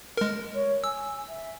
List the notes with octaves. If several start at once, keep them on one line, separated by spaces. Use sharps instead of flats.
G#3 A#4
C#5
G#5 E6
E5